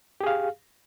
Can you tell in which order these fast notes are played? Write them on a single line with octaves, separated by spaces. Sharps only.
G4 G#4 F5